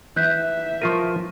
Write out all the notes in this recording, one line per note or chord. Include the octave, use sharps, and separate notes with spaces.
E3 E5 F#6 G6 B6
F3 F4 A#4 C#6 D#7